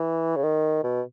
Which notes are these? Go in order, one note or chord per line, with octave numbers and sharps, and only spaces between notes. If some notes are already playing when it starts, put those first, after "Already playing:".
Already playing: E3
C#3
D#3
B2